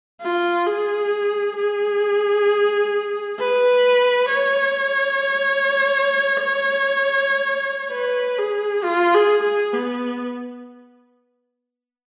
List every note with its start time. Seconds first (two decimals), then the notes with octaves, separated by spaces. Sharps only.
0.21 F4
0.66 G#4
1.57 G#4
3.38 B4
4.29 C#5
7.92 B4
8.38 G#4
8.84 F4
9.14 G#4
9.43 G#4
9.74 B3